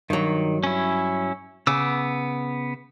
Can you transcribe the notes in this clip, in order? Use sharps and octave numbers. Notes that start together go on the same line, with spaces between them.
G2 D#3 F#3
C#4 E4
C#3 B3 D6 E6